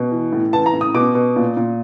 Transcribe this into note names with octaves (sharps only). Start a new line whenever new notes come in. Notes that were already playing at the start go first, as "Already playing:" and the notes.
Already playing: B2
E3
A2
E3 A5
A#5
A2
D#6
B2 D6
B2
A#2
A#2